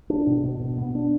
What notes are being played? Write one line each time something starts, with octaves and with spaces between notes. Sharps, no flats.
D4
B2
B2
B2
B3
D4